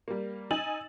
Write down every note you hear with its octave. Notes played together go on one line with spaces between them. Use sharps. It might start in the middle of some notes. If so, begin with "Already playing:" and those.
G3 A#3
D#4 D#5 G#5 E6 A6 F#7